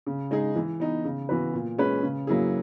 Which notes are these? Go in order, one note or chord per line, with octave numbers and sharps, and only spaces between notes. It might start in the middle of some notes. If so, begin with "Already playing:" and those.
C#3
G#3 D#4 G#4
E3
B3 D#4
C#3
E3 B3 F#4 B4
A#2
G#3 C#4 G#4 B4
C#3
F#3 A#3 E4 G#4